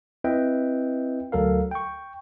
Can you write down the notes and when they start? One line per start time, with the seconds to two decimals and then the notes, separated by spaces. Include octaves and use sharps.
0.24 C4 E4 B4 D#5 E5 G5
1.32 D2 F#3 A4 A#4 F5
1.71 G5 C#6